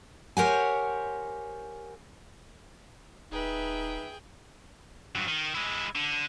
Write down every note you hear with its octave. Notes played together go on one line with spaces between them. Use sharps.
G4 A#4 C5 C#5 F#5 G#5
D#1 D#4 G#4 B4 E5 G5
G2 F#3
D#3
G#3 E4
D3